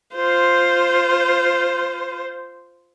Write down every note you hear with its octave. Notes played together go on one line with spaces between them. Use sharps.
F4 C5